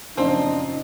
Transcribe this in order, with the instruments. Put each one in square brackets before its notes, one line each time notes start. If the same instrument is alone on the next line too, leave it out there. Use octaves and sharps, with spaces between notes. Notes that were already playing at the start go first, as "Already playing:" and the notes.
[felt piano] F#2 A#2 C#3 [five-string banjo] F3 C4 [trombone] D4 [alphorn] D#4